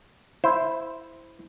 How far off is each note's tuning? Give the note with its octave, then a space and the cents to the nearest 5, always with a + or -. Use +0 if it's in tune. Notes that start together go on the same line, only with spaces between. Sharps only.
E4 +0 C5 +0